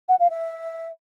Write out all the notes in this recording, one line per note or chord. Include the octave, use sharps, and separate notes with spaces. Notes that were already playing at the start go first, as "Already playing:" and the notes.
F#5
F5
E5